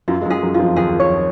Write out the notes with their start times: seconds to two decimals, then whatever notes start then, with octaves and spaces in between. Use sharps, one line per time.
0.08 F#2 F#3 F4
0.21 G#3
0.25 F#2 F#3
0.30 G#4
0.42 F#2 F#3
0.54 F4
0.59 F2 F3
0.76 D#2 D#3 G#4
1.00 C#5